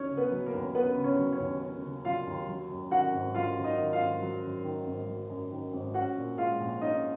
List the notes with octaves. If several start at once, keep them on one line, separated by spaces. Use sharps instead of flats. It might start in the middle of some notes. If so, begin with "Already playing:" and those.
Already playing: D#2 F#3 C#4 D#4 C#5
C#3
B3 B4
F#3
A#3 A#4
D#2
B3 C#4 B4
C#3
C#4 C#5
F#3
C#4 C#5
D#2
C#4
C#3
F#3 F4 F5
D#2
F#3
F#2
D#3 F#4 F#5
G#1
F#3 F4 F5
F#2
D#4 D#5
D#3
F4 F5
G#1
F#3
F#2
D#3
G#1
F#3
F#2
D#3
G#1
C#4 F#4 F#5
A#2
G#3 F4 F5
A#1
C#4 D#4 D#5